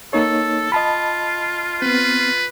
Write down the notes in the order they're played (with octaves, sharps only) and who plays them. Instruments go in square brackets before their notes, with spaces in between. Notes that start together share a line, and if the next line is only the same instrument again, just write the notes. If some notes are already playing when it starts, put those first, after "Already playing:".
[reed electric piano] A#3 D#4 C#5 [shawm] A4
[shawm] F4 [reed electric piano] D#5 A5 B5
[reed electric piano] B3 C4 [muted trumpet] B4